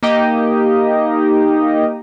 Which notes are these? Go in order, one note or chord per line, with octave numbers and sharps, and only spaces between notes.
A#3 D#4 G4 D#5